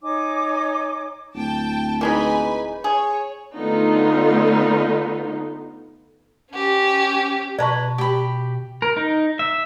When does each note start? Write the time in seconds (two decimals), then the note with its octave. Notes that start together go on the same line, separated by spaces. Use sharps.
0.02 D#4 C#5 G#5 D6
1.35 D1 G5 A5
2.01 E3 G#3 D#4 B4 G#5 B5
2.84 G#4 C#5
3.56 D3 A3 B3 D#4 F4
6.53 C#4 G4
7.59 B2 B4 D5 A5 A#5 C#6
7.98 G4 B5
8.82 A#4
8.97 D#4
9.39 E5